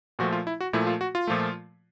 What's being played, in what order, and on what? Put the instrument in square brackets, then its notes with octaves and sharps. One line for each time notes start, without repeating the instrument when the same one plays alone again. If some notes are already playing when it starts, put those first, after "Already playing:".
[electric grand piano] A#2 F3 A3 F#4
F4
E4
F#4
A#2 F3 A3 E4
F4
F#4
F4
A#2 F3 A3